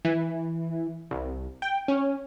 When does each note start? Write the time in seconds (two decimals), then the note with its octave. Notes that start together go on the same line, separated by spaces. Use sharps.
0.05 E3
1.11 C2
1.62 G5
1.88 C#4